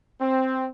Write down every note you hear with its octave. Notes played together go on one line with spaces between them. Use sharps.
C4